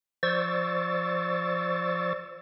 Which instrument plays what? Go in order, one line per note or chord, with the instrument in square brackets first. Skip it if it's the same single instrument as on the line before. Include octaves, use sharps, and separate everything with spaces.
[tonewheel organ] F3 C5 D5 C#6 E6 A6